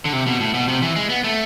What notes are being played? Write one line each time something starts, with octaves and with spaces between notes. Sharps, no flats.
D3
C3
B2
A2
B2
C3
E3
G#3
B3
A3